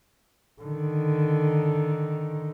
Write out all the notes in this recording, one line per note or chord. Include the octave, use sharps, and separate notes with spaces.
D3 D#3